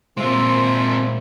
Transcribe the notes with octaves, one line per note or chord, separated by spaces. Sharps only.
A#2 G#3 A#3 C4 F4 C5 E5